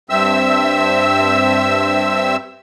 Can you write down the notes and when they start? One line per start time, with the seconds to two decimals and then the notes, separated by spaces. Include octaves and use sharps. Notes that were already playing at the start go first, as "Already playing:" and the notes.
0.10 G2 C4 E5 E6